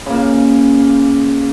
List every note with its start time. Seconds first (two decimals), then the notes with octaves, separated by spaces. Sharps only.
0.06 C#3 A#3